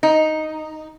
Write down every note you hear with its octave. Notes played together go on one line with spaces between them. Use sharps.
D#4